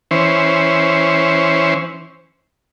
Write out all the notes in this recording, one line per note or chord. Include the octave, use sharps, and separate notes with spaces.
E3 C#4 C5